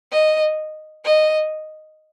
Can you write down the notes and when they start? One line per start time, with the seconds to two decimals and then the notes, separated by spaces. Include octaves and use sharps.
0.12 D#5
1.05 D#5